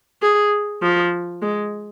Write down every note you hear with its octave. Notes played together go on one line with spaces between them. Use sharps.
G#4
F3
G#3